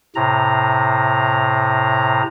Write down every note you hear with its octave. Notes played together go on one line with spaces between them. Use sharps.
A2 C3 A#5